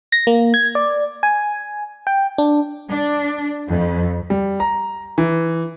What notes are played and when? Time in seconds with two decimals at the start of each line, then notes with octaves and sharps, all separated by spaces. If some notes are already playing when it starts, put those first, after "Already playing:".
0.12 A#6
0.27 A#3
0.54 G#6
0.75 D5
1.23 G#5
2.07 G5
2.38 D4
2.91 D4
3.69 F2
4.30 G3
4.60 A#5
5.18 E3